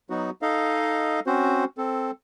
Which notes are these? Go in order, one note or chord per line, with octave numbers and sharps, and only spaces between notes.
F#3 B3 D#4 F#4
D#4 A4 D#5 F5
C4 C#4 F#4 C5
C4 A4